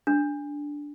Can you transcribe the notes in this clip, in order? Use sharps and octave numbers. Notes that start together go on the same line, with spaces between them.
D4